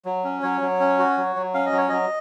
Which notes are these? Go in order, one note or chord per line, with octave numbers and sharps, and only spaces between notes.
F#3
C#4
F#3 C#5
F#3
C#4
F#4
F#3
F#3
C#4 F5
D#5
F#3
C#5
F#3 D#5